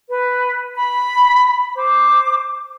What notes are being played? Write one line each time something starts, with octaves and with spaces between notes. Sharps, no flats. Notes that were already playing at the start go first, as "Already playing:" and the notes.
B4
B5
C5 D6